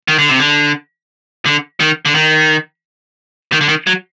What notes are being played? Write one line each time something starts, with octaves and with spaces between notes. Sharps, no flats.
D#3
D3
C3
D3
D3
D#3
D3
D#3
D#3
D3
D#3
F#3